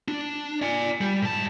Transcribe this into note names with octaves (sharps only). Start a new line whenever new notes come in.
D4
D5 G#5
G3
G#2 A5